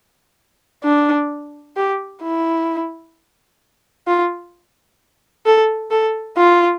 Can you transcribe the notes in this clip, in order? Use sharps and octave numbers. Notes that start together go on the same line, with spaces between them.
D4
G4
E4
F4
A4
A4
F4